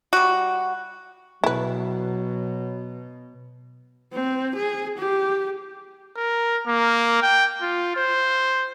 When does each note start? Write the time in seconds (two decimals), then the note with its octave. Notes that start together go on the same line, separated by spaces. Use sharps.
0.13 G3 F#4
1.44 B2 F#3 E4 B4
4.13 C4
4.56 G#4
4.99 G4
6.17 A#4
6.67 A#3
7.22 G5
7.62 F4
7.96 C5